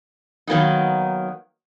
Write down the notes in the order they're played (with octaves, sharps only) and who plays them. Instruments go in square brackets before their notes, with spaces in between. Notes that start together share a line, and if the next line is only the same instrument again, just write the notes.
[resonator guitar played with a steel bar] D#3 F#3 A#3 B3 D#4